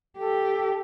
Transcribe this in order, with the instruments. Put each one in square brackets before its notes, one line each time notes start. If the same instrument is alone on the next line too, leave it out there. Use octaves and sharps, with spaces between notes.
[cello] G4 [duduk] A4